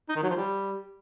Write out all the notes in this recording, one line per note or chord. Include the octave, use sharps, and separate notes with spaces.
D#4
D#3
F#3
F3
G3